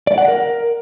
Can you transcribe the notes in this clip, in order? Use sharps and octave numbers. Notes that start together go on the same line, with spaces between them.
D5
F#5
A#4